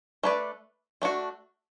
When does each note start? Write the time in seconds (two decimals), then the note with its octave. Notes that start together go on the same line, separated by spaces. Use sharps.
0.23 A3 D4 B4 D5
1.02 A3 D4 F#4